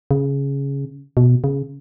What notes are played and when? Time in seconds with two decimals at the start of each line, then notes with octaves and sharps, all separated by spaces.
0.11 C#3
1.17 B2
1.44 C#3